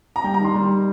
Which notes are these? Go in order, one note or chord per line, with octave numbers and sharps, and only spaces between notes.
A#5
G3 G5
A#5
D#3 C6
G3